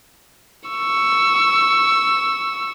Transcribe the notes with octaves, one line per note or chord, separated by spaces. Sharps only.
C#6 E6